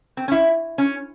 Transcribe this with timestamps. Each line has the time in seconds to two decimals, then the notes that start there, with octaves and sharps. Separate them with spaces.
0.17 C4
0.28 C#4
0.32 E4
0.78 C#4